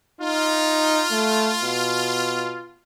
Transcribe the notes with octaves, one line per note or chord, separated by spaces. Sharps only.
D#4 F4
A3
B2